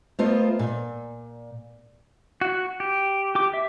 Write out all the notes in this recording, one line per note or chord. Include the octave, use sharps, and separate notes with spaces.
A3 B3 F4 A#4 C5 D#5
A#2
F#4
G4
G4 D6
E5